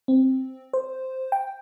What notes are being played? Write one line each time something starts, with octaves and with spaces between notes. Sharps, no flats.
C4
C5
G5